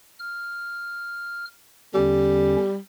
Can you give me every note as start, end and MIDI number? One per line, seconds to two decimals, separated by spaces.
0.19 1.45 89
1.94 2.56 40
1.94 2.56 50
1.94 2.77 55
1.94 2.56 61